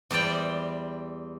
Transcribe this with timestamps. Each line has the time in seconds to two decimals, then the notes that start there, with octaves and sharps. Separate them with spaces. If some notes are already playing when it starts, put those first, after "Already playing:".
0.11 E2 G3 C5 D5 G5